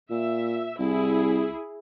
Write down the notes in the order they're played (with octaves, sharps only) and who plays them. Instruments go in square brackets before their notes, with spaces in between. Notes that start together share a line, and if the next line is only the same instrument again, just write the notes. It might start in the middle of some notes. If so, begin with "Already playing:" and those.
[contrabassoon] A#2 [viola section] E5
[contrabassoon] C2 [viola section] E4 G#4